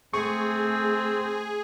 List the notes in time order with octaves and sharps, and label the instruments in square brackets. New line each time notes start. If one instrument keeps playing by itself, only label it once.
[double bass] A3 [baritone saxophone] C4 [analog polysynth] G#4 [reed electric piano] C#6